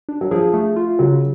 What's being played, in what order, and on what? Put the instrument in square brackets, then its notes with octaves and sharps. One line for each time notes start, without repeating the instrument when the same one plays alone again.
[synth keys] D4
[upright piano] F#3
[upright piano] F3 [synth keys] G#4
[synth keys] A3
F4
[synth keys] C#3 [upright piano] F#3